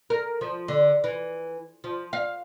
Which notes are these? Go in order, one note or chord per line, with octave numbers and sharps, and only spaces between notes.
A#4
F3
D3
E3
F3
F5